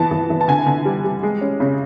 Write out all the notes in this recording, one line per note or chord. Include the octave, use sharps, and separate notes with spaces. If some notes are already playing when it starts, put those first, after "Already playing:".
Already playing: E3 B3 A5
E3
E3
A5
D3 G#5
D3
G3
G3
G#3
C#4
C#3